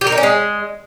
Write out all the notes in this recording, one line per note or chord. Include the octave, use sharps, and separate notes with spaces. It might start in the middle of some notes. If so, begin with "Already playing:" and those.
G4
A#4
D#4
C#4
G#3